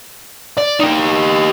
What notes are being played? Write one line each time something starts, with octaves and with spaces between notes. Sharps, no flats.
D5
D#4 G4